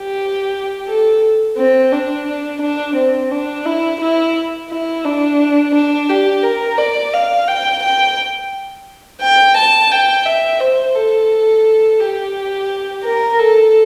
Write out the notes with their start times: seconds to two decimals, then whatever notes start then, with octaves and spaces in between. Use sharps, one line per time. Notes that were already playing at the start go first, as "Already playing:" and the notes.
Already playing: G4
0.88 A4
1.57 C4
1.92 D4
2.62 D4
2.96 C4
3.31 D4
3.65 E4
4.01 E4
4.70 E4
5.05 D4
5.75 D4
6.09 G4
6.43 A#4
6.78 D5
7.13 F5
7.48 G5
7.83 G5
9.21 G5
9.57 A5
9.92 G5
10.26 E5
10.60 C5
10.95 A4
12.00 G4
13.04 A#4
13.39 A4